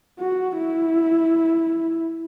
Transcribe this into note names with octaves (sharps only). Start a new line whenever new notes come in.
F#4
E4